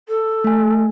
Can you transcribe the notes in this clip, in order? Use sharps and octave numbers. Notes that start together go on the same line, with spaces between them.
A4
A3 G#5